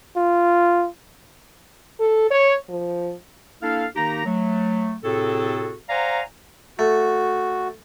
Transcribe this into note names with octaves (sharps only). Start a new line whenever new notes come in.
F4
A4
C#5
F3
A#3 D4 E4 A4 F5
D#3 A#3 D#4 G4 A#5
F#3 A3
A2 C3 C4 F#4 G#4 A4
C5 D5 F5 F#5 G#5 A#5
A3 F#4